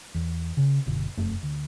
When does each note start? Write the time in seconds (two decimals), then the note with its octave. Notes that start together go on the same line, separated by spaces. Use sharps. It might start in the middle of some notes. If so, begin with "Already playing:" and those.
0.15 E2
0.57 C#3
0.86 F#1 D2 B2
1.17 F1 F#2 A3
1.43 D2